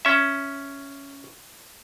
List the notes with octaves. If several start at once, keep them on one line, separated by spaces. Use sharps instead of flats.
C#4 E5